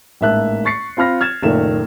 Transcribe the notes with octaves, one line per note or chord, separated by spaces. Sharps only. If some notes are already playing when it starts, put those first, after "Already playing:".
A1 G#2 A#3 E5 A5 F#6
C#6 A6 C7 C#7
C4 F4 B5 F6 A#6
F6 G#6 A6 E7
F#1 A#2 D#3 A3 E7